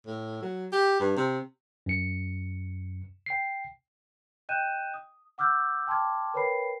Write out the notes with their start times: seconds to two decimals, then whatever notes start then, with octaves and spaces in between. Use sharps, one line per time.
0.06 A2
0.42 F#3
0.72 G4
0.99 G2
1.16 C3
1.86 F#2 C#7
3.26 G5 C7
4.49 D#5 G5 F#6 G6 D#7 E7
4.94 D#6
5.38 F#5 D6 E6 F6 G6
5.87 G5 A5 C6 D6 F6 G#6
6.34 A#4 B4 C#5 G5 B5 C7